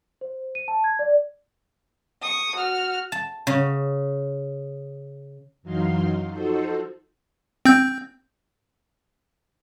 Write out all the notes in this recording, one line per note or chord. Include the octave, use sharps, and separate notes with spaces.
C5
D#7
A5
G#6
D5
C#6 D#6
F#4 F6
A5
C#3
F#2 E3 F#3 D#4 F5 C6
F3 D#4 F#4 A4 C5
C4 G6